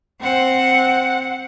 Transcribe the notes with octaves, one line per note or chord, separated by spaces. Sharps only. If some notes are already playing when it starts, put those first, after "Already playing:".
C4 F#5